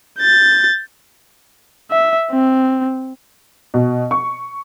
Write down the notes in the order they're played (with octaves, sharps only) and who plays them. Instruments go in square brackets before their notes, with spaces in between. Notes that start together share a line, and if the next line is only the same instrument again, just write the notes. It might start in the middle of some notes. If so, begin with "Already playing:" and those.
[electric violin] G6 A6
E5
C4
[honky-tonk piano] B2
C#6